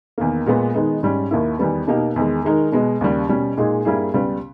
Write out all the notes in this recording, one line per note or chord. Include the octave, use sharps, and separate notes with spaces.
E2 D#3 A#3
A#2 G#3 B3
D#3 G#3 B3 D#4
G#2 G3 C#4
D#2 D#3 A#3 E4
E2 D#3 G3 B3
B2 A#3 D#4 G4
E2 D#3 G#3
D#3 G#3 D#4 A#4
B2 G#3 B3
D#2 C#3 G3
B2 G3 C#4
A#2 G#3 D#4 G#4
G2 G3 A#3 E4 G#4
C#2 C#3 G3 B3